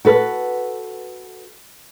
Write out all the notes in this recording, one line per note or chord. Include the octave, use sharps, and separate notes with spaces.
F#4 A4 B4